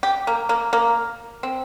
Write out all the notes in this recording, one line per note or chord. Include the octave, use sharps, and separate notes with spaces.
G4
A#3
A#3
A#3
C4